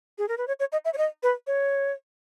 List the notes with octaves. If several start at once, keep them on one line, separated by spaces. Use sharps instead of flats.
G#4
A#4
B4
C#5
C#5
D#5
E5
C#5
D#5
B4
C#5